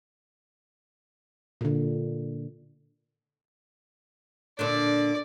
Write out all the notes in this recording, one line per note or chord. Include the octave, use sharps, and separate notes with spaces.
A#2 D3
A#2 D3 D4 D5